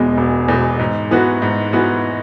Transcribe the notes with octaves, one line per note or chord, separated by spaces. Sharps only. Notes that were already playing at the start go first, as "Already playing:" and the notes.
Already playing: E1 E2 B2 G#3
E1
E2 B2 G#3
G#2
E3 B3 F#4
G#2
E3 B3 F#4